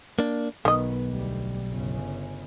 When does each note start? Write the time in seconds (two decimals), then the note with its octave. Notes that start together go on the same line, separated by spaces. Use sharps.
0.19 A#3 D4
0.65 B1 D#3 B3 D#5
1.07 D2 G3
1.68 G1 C#3